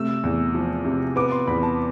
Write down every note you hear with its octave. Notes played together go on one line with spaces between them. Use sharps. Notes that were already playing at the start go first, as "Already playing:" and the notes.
Already playing: C3 A3 E6
E2
F3
C3
B3 D6
C6
E2 B5
A5